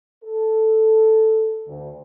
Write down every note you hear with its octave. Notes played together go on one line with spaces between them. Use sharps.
A4
D2